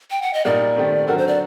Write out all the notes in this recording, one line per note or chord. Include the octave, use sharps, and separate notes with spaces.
G5
F#5
D#5
A#2 G3 A#3 D#4 D5
D#3 A3 C4 G4
D3 F#3 C4 F#4 A4 A#4
C5
D5